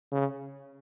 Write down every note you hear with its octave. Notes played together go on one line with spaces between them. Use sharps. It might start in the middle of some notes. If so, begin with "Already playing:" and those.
C#3